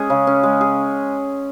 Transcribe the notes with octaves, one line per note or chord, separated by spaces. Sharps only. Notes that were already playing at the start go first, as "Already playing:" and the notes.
Already playing: G#3 C#4 G#4
C#3
C#4
G#3
G#4